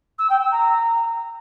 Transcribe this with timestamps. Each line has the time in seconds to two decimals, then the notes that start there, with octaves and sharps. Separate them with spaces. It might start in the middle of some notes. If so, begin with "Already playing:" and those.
0.18 E6
0.29 G5
0.40 E6
0.51 A#5